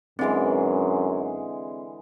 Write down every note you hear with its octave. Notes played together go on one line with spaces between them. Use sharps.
F#2 D3 E3 G#3 C4 G#4